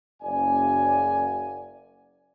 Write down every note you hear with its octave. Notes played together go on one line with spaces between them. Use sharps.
F#1 D5 G#5